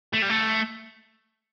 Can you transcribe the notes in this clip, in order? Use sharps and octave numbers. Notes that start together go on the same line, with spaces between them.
A3
G3
A3